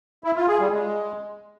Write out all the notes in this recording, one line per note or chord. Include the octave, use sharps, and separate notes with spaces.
E4
F4
G#4
G3
G#3